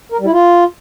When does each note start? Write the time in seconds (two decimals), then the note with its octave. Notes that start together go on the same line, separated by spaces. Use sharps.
0.12 A#4
0.19 G3
0.26 E4
0.33 F4